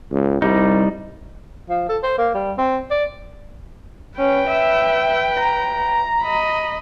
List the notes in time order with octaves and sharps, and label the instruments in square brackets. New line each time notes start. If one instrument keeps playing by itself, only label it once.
[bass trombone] C#2
[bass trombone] C2 [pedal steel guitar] G3 D#4
[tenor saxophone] F3
A4
C5
A#3
G3
C4
D5
[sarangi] C#4 [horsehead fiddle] B4 G5
[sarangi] E5
A#5
[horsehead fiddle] D#5 B5